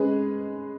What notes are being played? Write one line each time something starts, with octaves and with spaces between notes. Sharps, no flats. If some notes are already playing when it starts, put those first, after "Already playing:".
Already playing: G#3 C#4 G#4 B4